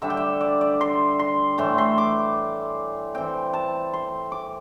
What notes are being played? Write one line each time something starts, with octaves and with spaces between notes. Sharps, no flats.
D3 G3 D4 E5
G5
E5
D5
D5
C6
C6
A2 E3 A3 C6
C6
D6
E3 C4 G5
A5
C6
D6